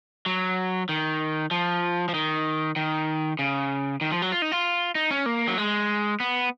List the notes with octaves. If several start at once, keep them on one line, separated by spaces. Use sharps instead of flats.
F#3
D#3
F3
F3
D#3
D#3
C#3
D#3
F3
F#3
F4
D#4
F4
D#4
C#4
A#3
F#3
G#3
B3